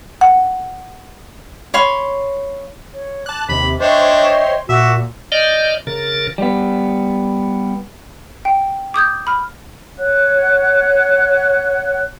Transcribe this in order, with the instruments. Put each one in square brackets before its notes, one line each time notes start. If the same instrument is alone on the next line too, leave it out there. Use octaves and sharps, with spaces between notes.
[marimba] F#5
[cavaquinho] C#5 F5 B5 C6
[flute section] C#5
[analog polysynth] A5 F#6 [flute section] D6
[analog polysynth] D#2 C3 [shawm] B5
[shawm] D4 [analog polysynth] C5 C#5 C6 [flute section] D#5 E5 G5
[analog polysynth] A#2 [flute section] F#4 D6 [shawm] E5
[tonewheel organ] D5 D#5 F6 G6
C#3 A#4 A6
[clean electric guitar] G3 B3
[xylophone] G5
D6 D#6 G6 G#6
B5 F6
[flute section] C#5 F#5 F#6